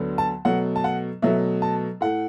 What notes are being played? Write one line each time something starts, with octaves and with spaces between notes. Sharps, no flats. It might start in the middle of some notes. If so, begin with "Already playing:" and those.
Already playing: D2 D3 F#3 B3
A5
B2 F#3 A3 F#5
A5
F#5
B2 F#3 A3 E5
A5
A2 A3 F#5